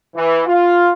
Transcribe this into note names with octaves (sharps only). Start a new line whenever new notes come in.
E3
F4